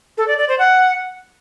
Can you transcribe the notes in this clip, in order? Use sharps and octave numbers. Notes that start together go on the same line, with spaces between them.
A4
D5
D5
C5
F#5